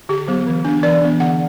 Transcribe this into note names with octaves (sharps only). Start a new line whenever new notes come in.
D3 G4
F#3 B3
E3
B3 D4
E3 D5
B3 D4
D3 F#5